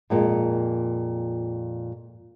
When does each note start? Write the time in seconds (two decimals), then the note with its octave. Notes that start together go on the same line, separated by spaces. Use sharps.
0.10 F2 A#2 G#3